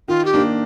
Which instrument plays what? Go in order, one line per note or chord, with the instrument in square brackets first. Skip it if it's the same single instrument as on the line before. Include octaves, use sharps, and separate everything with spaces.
[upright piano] D#3 [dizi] F4
[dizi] G4
[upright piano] A#3 D4